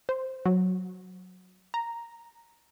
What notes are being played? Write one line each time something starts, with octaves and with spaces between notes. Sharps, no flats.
C5
F#3
A#5